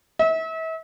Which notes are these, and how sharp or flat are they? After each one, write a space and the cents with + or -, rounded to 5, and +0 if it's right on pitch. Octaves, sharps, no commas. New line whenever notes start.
E5 -35